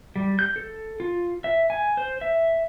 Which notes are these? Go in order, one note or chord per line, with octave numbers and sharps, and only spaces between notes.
G3
G6
A4
F4
E5
G#5
C5
E5